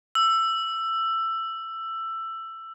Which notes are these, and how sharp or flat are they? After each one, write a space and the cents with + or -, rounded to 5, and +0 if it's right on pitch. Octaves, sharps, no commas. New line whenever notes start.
E6 +15